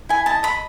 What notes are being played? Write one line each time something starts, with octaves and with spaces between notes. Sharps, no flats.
E4 G#5
D#5 A5
D#5 B5